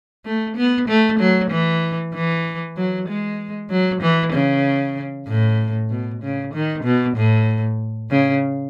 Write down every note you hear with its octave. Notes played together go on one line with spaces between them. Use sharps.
A3
B3
A3
F#3
E3
E3
F#3
G#3
F#3
E3
C#3
A2
B2
C#3
D#3
B2
A2
C#3